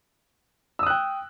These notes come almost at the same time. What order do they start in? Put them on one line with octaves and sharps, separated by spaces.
E6 D#6 F#6 G5